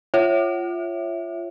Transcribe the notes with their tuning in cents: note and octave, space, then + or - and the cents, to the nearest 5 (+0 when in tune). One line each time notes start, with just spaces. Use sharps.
F4 -15 C#5 -10 E5 +0